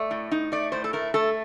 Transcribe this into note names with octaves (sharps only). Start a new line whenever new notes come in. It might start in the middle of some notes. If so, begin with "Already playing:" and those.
Already playing: A3 D5
A2
D#4
A3 D5
A2 C5
A4
A3 A#4
A3 A4